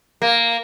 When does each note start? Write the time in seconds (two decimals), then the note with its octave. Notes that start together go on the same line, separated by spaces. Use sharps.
0.22 A#3